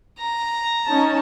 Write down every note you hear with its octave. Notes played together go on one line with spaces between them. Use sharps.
A#5
C#4 D#4 A5